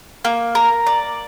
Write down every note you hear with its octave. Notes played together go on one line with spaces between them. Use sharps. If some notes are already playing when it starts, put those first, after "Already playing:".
A#3
A#4
D5